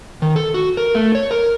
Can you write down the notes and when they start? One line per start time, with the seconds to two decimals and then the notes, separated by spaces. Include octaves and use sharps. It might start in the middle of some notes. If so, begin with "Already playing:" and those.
0.22 D#3
0.36 A4
0.54 F#4
0.77 A#4
0.95 A3
1.15 C#5
1.31 A#4